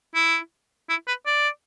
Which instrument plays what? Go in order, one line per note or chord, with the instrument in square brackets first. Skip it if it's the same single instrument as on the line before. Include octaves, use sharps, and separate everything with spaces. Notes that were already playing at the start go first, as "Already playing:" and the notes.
[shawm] E4
E4
B4
D5